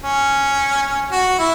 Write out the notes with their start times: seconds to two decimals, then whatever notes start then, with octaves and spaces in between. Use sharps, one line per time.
0.03 C#4
1.11 F#4
1.39 E4